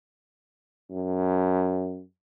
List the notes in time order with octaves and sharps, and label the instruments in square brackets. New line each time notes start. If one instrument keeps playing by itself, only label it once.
[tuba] F#2